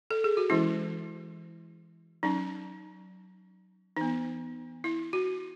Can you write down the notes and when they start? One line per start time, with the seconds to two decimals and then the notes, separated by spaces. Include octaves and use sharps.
0.11 A4
0.24 G#4
0.37 F#4
0.50 E3 G#3 C#4 E4
2.23 F#3 C#4 D#4
3.97 E3 B3 D#4
4.84 E4
5.13 F#4